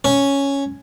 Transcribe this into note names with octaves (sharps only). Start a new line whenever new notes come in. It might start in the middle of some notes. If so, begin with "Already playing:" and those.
C#4